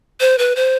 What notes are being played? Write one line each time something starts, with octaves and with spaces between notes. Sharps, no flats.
C5
B4
C5